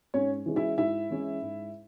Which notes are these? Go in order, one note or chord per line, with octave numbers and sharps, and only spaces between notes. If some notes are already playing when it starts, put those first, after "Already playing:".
G#2 C#4 C#5
E3 G#3 C#4
E4 E5
G#2 E4 E5
E3 G#3 C#4
G#2